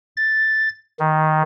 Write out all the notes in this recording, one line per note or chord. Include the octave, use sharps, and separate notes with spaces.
A6
D#3